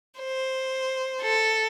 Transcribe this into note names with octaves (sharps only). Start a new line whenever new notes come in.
C5
A4